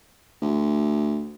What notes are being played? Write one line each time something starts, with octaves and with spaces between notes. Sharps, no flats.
D2